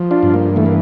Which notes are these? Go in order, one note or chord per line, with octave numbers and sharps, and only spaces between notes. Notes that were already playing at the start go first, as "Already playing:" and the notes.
Already playing: F3
D4 F4
G2
A#3
E3 A3
A#3